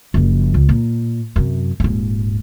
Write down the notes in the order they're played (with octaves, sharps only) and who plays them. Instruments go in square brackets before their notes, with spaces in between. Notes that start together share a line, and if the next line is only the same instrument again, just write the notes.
[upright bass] F#1 F3
C#2
A#2
F#2 C3
D#1 G#2